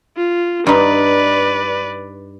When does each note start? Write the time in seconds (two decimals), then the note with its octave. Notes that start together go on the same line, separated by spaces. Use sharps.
0.17 F4
0.67 G2 D#4 B4 D5